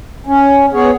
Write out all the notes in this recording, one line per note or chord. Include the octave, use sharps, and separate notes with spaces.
C#4
B3 G#4 C#5